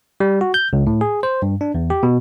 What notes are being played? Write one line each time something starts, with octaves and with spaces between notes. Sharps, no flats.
G3
F#4
G6
C#2
A2
G#4
C5
G2
D4
E2
G4
B2